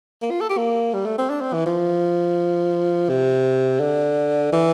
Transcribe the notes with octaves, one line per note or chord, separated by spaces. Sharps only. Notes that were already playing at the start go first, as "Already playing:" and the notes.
A#3
F4
A4
G4
A#3
G3
A3
C4
D4
C4
E3
F3
C3
D3
E3